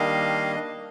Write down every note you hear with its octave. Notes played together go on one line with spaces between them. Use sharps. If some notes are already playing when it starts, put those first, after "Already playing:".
Already playing: D#3 G3 A#3 D4 D#5 F5